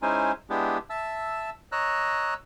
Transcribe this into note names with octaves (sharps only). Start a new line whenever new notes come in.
G#3 C#4 D#4 E4 C5 G#5
G#3 B3 D4 E4 G4
E5 A5 E6
C#5 D#5 A#5 E6 F#6